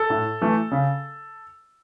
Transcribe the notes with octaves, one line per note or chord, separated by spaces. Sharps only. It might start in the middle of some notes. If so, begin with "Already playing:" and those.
Already playing: A4
A2
E3 A3
C#3